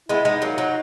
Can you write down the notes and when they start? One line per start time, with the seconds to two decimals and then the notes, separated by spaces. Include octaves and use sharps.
0.09 G#3 B3 E4
0.25 G#3 B3 D#4
0.42 F#3 A#3
0.58 F#3